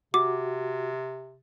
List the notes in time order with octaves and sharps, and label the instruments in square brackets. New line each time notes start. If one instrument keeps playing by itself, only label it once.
[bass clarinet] C3 [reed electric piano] F#4 [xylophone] D6